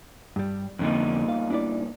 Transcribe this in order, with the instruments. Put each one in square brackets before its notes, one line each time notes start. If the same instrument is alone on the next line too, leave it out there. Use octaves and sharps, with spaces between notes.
[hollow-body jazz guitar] G2 G3
[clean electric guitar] C2 A#2 D#4 [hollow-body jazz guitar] F2 D3
[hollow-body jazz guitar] F5
D4 E4 D5